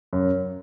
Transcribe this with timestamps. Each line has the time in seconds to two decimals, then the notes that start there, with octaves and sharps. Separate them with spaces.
0.13 F#2